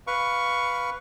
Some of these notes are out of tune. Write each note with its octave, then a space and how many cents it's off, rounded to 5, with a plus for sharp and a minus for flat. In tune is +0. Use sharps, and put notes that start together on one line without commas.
B4 +0 F5 +5 C#6 +10